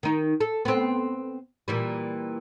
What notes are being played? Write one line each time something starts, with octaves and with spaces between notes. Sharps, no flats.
D#3 D#4
A4
B3 C4
A#2 E3 G3